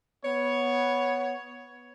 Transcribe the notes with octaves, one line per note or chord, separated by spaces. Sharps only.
B3 C#5